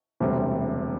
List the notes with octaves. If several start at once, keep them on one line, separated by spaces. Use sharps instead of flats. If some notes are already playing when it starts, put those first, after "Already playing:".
E1 D2 C3 G3